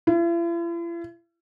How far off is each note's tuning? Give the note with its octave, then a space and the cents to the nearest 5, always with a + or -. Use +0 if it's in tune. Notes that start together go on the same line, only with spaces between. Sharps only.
E4 +45